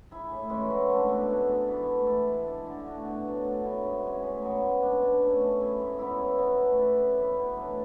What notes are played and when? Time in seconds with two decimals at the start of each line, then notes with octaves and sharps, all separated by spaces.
0.11 E4 G#4
0.31 A2
0.50 E3 G#3 C#4
0.70 F#3
0.89 A3 D4
1.09 B2
1.29 A3 D4 G#4
1.49 G#2
1.68 E3 B3 E4
1.87 A3
2.06 E4 A4
2.27 G#3
2.46 D4 A4
2.66 D3
2.86 A3 D4 F#4
3.05 B2
3.25 F#3 A3
3.45 D3
3.63 F#3 B3 E4
3.84 G#2
4.04 G#3 C#4
4.23 A2
4.42 F#3 B3
4.62 G#3
4.82 B3 D4
5.02 B2
5.22 A3 C#4
5.41 A3
5.61 E4 G#4
5.79 G#2
5.99 F#3 B3 E4
6.19 C#3
6.38 F#3 B3 F#4
6.58 A3
6.78 E4 B4 D5
6.97 C#3
7.17 E3 B3
7.36 B2
7.56 F#3 A3 D4